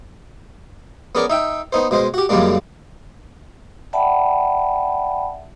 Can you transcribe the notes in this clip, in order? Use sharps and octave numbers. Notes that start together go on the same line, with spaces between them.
B3 C#4 G#4 A#4 D5
D#4 E5 G5
B3 D#4 C5
B2 G#3 C5 D#5
F#4 G4
F#2 C#3 G3 G#3 A#3 D4
D5 E5 F#5 G5 A5 B5